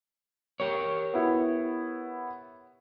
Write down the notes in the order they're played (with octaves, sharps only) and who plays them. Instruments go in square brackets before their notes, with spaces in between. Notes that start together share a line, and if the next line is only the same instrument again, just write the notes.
[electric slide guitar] G4 A#4 C#5
[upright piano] B3 E4